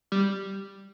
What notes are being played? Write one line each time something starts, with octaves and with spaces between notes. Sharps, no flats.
G3